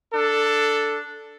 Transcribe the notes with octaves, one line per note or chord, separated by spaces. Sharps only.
D4 A4